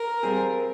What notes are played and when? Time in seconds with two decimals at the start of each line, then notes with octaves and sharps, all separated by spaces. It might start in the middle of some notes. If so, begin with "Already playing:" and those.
Already playing: A#4
0.23 G3 C4 F4 G#4